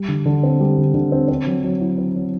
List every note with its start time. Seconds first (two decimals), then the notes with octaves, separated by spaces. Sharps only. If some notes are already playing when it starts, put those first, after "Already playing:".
Already playing: G3
0.08 D3
0.26 D3
0.43 C4
0.60 G3
0.78 D3
0.94 D3
1.12 C4
1.29 C4
1.47 F#3
1.64 F#3
1.80 E4
1.98 C4
2.16 F#3